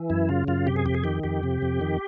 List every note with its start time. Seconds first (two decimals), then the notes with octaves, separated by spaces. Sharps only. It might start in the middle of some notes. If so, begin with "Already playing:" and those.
Already playing: E3
0.10 F#2 E4
0.29 C#3 F4
0.48 F#2 F4
0.66 C3 G4
0.76 G#4
0.85 F2 G4
0.94 G#4
1.04 D#3 G4
1.23 F2 G4
1.43 C3
1.62 F2
1.81 D#3